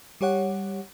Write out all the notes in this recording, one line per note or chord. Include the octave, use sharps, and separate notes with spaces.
G3 G4 C#5 F#5